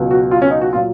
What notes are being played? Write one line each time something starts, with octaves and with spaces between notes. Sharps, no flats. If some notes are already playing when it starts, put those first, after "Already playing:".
Already playing: C#2 B2 F#3
F#4
F4
C#4
D#4
F#4
A#2 F#3 F4